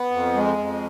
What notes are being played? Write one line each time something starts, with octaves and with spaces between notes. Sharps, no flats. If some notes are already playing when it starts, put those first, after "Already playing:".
Already playing: B3
F2
G#3
F2